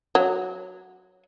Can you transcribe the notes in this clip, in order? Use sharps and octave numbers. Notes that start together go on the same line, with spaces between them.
F#3